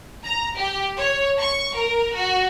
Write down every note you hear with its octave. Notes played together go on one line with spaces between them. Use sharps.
A#5
G4
C#5
C#6
A#4
F#4